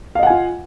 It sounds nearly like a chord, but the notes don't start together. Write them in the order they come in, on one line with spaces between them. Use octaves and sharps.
F5 D#5 F#5 G#5 F4